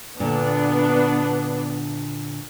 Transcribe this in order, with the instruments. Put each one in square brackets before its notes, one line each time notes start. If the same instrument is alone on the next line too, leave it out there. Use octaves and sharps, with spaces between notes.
[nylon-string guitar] A#2 D3 [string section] B3 D4